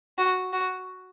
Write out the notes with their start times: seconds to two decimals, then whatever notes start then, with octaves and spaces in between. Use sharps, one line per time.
0.18 F#4
0.53 F#4